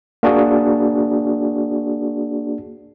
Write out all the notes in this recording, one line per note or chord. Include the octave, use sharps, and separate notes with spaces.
A#3 D4 F#4 G#4